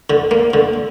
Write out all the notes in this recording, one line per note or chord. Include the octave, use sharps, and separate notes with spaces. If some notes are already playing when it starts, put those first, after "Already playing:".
D3
A#3
D3